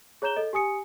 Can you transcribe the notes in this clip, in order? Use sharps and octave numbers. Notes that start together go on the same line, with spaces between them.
G#4 C#5 A#5 G6 E7 G7
A4 D#5
G4 G#5 D#6 C#7